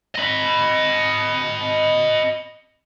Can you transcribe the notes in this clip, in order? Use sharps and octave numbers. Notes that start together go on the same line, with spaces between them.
D#5 B5